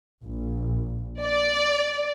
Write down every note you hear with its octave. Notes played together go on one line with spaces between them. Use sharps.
A#1
D5